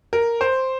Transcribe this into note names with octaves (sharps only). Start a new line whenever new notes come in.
A#4
C5